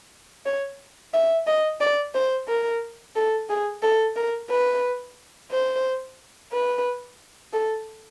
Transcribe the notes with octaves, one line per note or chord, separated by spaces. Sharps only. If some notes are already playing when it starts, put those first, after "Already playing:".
C#5
E5
D#5
D5
C5
A#4
A4
G#4
A4
A#4
B4
C5
B4
A4